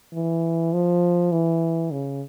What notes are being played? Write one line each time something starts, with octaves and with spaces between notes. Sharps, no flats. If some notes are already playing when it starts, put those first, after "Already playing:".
E3
F3
E3
C#3